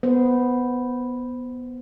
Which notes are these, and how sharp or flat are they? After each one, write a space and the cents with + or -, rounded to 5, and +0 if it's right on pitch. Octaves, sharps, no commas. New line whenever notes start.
B3 +0 C5 -15